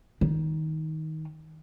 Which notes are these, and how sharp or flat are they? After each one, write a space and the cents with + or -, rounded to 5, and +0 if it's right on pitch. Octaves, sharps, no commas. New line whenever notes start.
D#3 +15